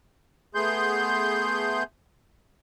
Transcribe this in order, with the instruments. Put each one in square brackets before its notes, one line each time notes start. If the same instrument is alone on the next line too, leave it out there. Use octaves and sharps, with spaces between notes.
[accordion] A3 B3 G#4 C6 G6